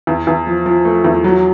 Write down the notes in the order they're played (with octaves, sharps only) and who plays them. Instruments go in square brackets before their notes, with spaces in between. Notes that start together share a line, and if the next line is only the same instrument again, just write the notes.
[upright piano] E2
E2
F3
F3
A3
E2
F#3